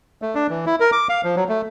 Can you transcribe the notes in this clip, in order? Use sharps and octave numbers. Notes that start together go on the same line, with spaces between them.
A3
D4
E3
E4
A#4
D6
F5
F3
F#3
A3